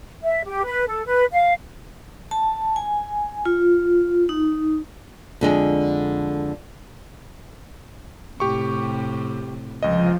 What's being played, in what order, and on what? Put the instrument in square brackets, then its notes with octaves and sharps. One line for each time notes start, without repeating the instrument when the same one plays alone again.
[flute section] E5
G4
B4
A4
B4
F5
[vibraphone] A5
G#5
F4
D#4
[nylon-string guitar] F2 D3 G#3
[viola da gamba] A2 C3 [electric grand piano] G4 C#6
[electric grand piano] C#2 D#5 [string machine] F3